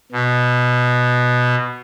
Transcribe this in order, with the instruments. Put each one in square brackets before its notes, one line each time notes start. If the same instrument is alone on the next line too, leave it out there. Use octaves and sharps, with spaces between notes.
[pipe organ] B2